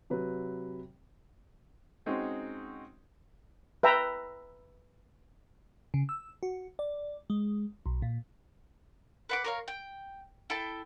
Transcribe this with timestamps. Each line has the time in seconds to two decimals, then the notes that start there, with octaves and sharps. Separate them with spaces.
0.10 C3 F#3 B4
2.06 G#3 C4 C#4 D#4 F#4 G#4
3.83 B4 E5 G5 A#5
5.94 C#3
6.09 E6
6.43 F#4
6.79 D5
7.30 G#3
7.86 B1
8.02 A#2
9.29 B4 F#5 D6
9.44 A#4 C#5 F5
9.68 G5
10.50 E4 A4 G5 A5